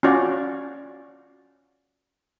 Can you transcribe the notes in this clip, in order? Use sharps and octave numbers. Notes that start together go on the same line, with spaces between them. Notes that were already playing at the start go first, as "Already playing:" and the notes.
C#4 F4 F#4 D5